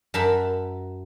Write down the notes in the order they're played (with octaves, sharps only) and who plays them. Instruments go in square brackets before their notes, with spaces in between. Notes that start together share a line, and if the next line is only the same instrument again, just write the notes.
[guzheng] F#2 A#4 E5 A5 B5